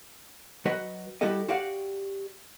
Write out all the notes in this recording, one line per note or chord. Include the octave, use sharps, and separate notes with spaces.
F#3 F#4 B4 D#5
G3 E4 F#4 G4 A4 D#5
F#4 G4 D5 F5 F#5